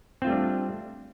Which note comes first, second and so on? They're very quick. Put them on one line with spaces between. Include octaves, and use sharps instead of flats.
C4 F4 A3 G3 D4